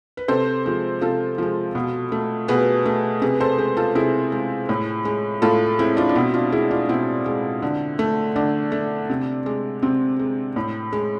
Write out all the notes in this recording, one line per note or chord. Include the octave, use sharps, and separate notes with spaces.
B4
C3 A4 C5
F3 G#3
C3 F4 A4
F3 G#3
B2
A3
B2 G#4 B4
A3
C3 G#4 B4
A4 C5
G#3 G#4 B4
F4 A4
C3 E4 G#4
G#3
A2
G#3
A2 F4 A4
G#3 C4 E4
D4 F4
D4
B2 C4 E4
D4 F4
G#3 E4 G#4
D4 F4
B2 C4 E4
G#3
D3
A3
D3 D4
A3
C3
G#3
C3 C4
G#3
A2
G#3